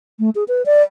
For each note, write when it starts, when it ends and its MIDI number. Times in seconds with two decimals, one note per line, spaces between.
0.19 0.30 57
0.35 0.44 68
0.48 0.65 71
0.66 0.82 74